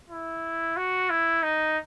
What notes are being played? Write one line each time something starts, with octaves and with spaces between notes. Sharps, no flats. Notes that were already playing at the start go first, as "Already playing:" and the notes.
E4
F#4
E4
D#4